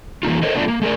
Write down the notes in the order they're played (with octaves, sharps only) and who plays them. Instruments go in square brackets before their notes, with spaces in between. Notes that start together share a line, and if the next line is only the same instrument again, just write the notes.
[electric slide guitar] E3 A#3 D#4 F4
A4 A#4 C5 C#5 D#5
A3 B3 D4 F4 C5 D5
A#3
A3 G#4 A#4 D5